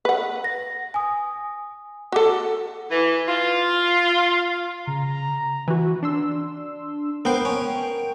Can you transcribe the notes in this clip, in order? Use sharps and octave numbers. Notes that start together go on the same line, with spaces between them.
B4 F#5
A#6
G#5 D#6
F#4 A4 F#5 D6
E3
F4
C#3 A#5
E3 F#4
D4 C6 E6
B3 A#4 C5 G5 D7
C#4